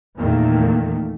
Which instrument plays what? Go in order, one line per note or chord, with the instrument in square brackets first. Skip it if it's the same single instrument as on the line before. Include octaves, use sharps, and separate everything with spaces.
[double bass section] E2 A#2 D#3 A3 A#3